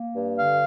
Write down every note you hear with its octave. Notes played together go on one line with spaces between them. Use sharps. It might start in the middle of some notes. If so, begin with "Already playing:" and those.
Already playing: A#3
G2
D3 F5